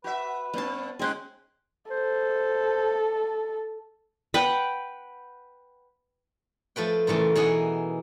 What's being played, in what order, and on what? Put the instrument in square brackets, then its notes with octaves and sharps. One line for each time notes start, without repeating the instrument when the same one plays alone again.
[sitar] F#4 E5 [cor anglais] B4
[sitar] G2 C4 [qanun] B3 A5
[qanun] G#3 C#4 G#4 [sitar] C4 D#4 [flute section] G5 C6 F#6
[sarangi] A4 [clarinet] C5
[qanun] B4 F#5 G5
[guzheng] F3 A3 B4 G5
A#2 C#3 E3 A3
B2 E3 D#4 G#4 F#5